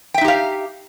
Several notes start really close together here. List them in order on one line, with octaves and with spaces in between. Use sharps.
G5 E5 D#4 G4 F5